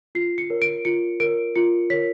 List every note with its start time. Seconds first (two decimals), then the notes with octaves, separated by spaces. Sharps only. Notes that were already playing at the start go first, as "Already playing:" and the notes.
0.15 F4 C7
0.38 C#7
0.50 A#4 C#5
0.62 D7
0.85 F4 C#7
1.20 A#4 C#5 D7
1.56 F4 C#7
1.90 A#4 C#5 B6